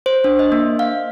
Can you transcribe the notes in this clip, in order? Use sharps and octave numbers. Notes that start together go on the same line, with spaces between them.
C5
D4
D#5
A#3
F5